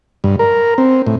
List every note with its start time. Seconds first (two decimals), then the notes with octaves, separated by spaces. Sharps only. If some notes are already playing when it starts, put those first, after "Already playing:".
0.24 G2
0.39 A#4
0.78 C4
1.07 A2